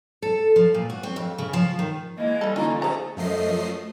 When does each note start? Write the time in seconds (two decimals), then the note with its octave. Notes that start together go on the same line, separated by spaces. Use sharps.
0.22 A4
0.56 F3
0.74 A#2
0.90 F#4
1.03 C4
1.16 F2
1.38 C#3
1.53 F3
1.79 D#3
2.17 E3 G#3 A#3 E4 D#5
2.41 F3 G3 A4
2.56 G2 D3 E3 A#3 C#4 D#4 F4 A#5
2.70 A#2
2.82 F3 A3 G#4 C5 A#5
3.17 F#2 F3 A3 D#5 C7